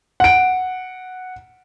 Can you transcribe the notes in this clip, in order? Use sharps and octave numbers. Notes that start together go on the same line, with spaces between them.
F#5 D7